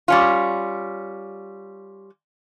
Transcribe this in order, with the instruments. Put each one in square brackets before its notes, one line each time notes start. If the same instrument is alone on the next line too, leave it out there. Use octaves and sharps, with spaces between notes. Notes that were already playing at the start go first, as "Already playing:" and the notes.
[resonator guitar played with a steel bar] G3 C#4 F4